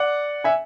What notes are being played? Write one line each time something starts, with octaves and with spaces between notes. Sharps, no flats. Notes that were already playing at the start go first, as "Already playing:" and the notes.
Already playing: D5 F#5
E5 G#5